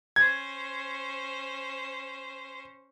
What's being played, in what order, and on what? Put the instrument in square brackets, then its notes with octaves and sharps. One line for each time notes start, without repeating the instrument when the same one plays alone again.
[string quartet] C#4 C5 [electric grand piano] G#6